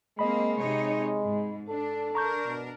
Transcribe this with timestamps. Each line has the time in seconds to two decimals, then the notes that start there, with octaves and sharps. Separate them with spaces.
0.19 G#3 A#3 C4 D#5 B5
0.60 C3 D#4 C#5
1.23 G#2
1.69 D4 A4
2.15 D4 A#4 A#5 C#6 G6
2.46 B2